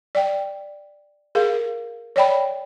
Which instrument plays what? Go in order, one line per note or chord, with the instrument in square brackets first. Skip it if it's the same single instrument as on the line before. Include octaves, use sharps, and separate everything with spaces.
[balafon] D5 G5
G#4 A#4 F5
C#5 D5 G5 B5